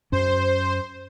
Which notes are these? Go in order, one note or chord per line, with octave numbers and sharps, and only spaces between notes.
F#2 C#4 C5